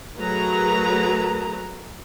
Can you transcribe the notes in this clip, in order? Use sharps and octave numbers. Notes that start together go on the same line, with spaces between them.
F#3 A3 G#4 A#4 B4 A#5